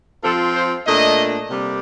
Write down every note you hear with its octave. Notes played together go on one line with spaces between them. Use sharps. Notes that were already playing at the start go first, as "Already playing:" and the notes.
F3 C4 F4 A4
C5
A#2 A3 D4 D#5
C3 G3 A#3